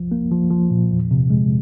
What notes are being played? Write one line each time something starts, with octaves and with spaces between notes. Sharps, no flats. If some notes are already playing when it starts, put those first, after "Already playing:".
Already playing: C2 F3
A#3
F3
F3
A#2
E2
C3
G#3